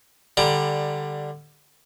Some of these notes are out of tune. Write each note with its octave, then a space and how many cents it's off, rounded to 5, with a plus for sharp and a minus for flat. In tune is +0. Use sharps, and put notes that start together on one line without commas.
D3 +10 G3 +15 A#5 +0